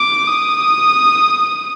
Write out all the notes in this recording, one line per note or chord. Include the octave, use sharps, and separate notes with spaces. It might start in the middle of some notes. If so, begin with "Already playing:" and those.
Already playing: D6
D#6